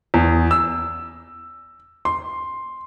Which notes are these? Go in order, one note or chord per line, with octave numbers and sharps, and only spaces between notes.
E2
E6
C6